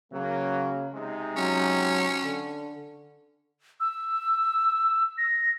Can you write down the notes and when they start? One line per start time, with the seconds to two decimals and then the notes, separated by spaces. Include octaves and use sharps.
0.12 C#3 F#3 A#3
0.94 C3 G#3 D#4
1.37 F#3 C#4
2.25 D3
3.80 E6
5.18 A#6